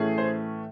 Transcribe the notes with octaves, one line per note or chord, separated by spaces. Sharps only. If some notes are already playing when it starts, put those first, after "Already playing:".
Already playing: A2 E3 A3 C#4 G#4
C5